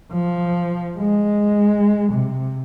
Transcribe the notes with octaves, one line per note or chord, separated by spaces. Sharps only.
F3
G#3
C3